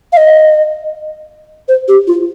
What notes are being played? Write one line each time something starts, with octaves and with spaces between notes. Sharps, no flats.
F5
D#5
C5
G4
F4